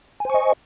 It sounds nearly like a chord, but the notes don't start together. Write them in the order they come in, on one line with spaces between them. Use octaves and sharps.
G#5 C5 C#6 D#5